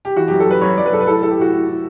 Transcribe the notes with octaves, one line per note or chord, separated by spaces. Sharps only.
G4
E3 F#4
F#2 G4
A4
F#2 B4
F#2 C#5
F#2 D5
B4
F#2 A4
B4
A2 A4
A2 A4
G4
A2 F#4
A2
A2